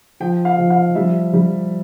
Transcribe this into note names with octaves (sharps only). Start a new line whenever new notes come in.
F3 G5
F5
F3
F5
G3 E5
G3